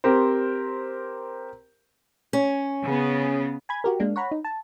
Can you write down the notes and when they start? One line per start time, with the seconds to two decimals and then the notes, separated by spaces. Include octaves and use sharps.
0.04 C4 G4 A#4 C5
2.33 C#4
2.82 C#3 B3
3.69 G#5 B5 G#6
3.84 F#4 G4 A#4
4.00 G#3 A#3 D4
4.16 C#5 F#5 A#5 B5
4.31 D#4
4.45 A5